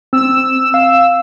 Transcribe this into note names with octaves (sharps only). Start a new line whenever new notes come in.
C4 E6
F5